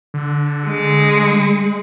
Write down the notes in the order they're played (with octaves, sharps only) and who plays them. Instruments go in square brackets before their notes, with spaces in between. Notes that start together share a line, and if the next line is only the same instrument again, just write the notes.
[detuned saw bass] D3
[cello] G#3